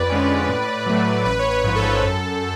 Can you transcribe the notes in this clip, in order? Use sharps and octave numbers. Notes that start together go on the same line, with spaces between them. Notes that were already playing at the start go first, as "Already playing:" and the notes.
Already playing: F2 B4 D5
D3 G#3 C#4
A2
F#3 A3
A1 B4
C#5
B4
G#2 F3
A4
F#2